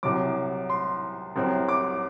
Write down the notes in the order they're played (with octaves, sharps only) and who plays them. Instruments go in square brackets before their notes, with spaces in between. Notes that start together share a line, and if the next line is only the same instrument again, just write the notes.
[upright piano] C2 C3 F#3 D6
C6
C2 C3 F#3 C4
D6